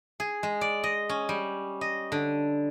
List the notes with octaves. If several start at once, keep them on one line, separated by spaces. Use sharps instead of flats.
G#4
G#3
D5
D#5
C#4
G3
D#5
D3